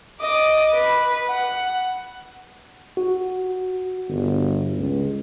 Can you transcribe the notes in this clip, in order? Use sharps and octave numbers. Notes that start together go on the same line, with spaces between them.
D#5 D6
B4
F#5
F#4
G1
C#2